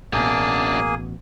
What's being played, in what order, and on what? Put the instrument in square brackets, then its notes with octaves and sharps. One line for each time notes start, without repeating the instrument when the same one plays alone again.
[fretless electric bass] A1 B2 [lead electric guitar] F#2 D4 [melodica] A#3 G#4 G#5